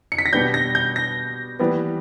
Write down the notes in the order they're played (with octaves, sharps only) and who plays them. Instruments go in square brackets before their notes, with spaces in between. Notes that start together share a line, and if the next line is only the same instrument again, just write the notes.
[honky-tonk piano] C#7
B6
A#6
[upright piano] B2 G3 B3 D4 [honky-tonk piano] G6
[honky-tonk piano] A#6
G6
A#6
[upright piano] E3 G3 B3